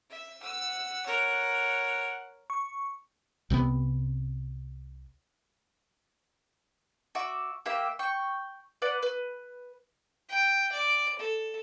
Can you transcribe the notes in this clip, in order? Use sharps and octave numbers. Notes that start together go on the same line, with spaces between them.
E5
F#5 E6
A#4 C#5
C#6
C2 C3 G#3 B3
F#4 E5 D6
A#3 G4 E5
G5 C#6
B4 D5 F#5
B4
G5
D5
A4